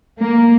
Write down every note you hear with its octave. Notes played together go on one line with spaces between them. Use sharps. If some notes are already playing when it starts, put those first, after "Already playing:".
A#3